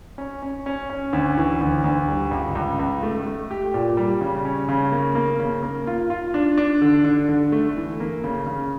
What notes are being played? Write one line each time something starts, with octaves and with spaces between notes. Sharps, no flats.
C#4
C#4
C#4
C#4
D2
E3
D2
D2
G3
C#2
C#2
C#2
A3
A3
G4
A#2
G3
C#3
C#4
C#3
A#3
A#3
C#3
A#3
F4
F4
D4
D4
D3
D3
D3
A3
E3
A#3
C#3
C#3